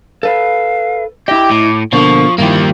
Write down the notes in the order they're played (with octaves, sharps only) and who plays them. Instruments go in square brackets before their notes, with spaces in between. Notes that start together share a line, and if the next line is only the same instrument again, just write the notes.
[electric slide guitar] A4 B4 [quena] F5
[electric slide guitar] E4 D#5 [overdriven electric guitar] G4 [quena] D6
[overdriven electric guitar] A2
[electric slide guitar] B2 D3 A#3 [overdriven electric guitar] F3 [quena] C#6
[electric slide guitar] G2 D#3 F3 [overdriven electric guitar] A#3 G4 [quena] E4